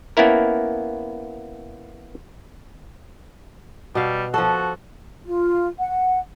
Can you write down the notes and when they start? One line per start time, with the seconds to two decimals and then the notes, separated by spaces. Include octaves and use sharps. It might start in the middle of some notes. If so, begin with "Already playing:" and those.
0.17 A#3 B3 C#4 E4 A#4
3.95 B2 G3 F5
4.34 F3 F#4 A4
5.26 F4
5.79 F#5